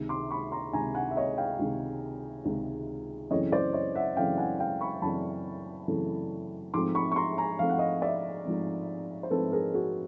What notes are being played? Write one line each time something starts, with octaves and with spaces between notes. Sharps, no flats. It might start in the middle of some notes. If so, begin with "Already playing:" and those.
Already playing: C#2 C3 D#3 G#3
C6 D6
B5 C#6
A#5 C6
C#2 C3 D#3 G#3 G#5 A#5
F#5 G#5
E5
C#5 D#5
F5 G5
C#2 C3 D#3 G#3
C#2 C3 D#3 G#3
F#2 C#3 E3 A3 C4 C#5 D#5
C5 D5
C#5 D#5
E5 F#5
F#2 C#3 E3 A3 C4 F5 G5
F#5 G#5
F5 G5
B5 C#6
F#2 C#3 E3 A3 C4 A5 B5
F#2 C#3 E3 A3 C4
G#2 F3 A3 C4 C6 D6
B5 C#6
C#6
A#5 C6
G#5 A#5
G#2 F3 A3 C4 F5
F#5
D#5 F5
D5 E5
G#2 F3 A3 C4
C5
G#2 F3 A3 C4 A4 B4
G#4 A#4
F#4 G#4